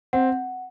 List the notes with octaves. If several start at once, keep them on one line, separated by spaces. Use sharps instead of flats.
C4 F#5